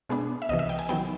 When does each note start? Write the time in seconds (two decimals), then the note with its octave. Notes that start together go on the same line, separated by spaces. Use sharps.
0.09 B2 G#3 B3 D4
0.42 E5
0.49 C2 C3 E3 D#5
0.59 E5
0.69 G5
0.79 G#5
0.89 D#3 F#3 B3 G5